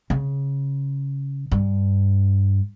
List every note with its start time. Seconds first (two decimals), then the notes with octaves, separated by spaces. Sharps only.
0.10 C#3
1.52 G2